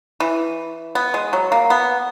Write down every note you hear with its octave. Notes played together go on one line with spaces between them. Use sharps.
E3
B3
G#3
F#3
A#3
B3